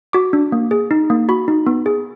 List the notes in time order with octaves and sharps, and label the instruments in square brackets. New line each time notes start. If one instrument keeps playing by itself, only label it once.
[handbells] F#4 D6
D4
A#3
G#4
D#4
A#3
F#4 B5
D#4
B3
G#4